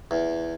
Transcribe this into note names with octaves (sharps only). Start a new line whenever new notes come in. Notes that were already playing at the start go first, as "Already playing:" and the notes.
E2